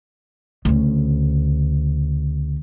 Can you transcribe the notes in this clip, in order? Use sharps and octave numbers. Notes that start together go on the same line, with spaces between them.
D2 C#3